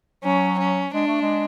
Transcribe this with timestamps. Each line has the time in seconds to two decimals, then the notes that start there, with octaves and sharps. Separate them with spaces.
0.24 F#3 C#4
0.59 C#4
0.93 G#3 D4
1.08 A3
1.22 G#3